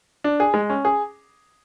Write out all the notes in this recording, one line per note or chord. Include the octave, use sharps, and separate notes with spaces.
D4
G#4
G#3
C#4
G#4